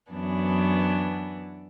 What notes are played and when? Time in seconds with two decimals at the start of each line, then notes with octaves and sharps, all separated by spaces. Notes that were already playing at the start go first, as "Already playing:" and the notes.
0.11 F#2 E3 B3 D4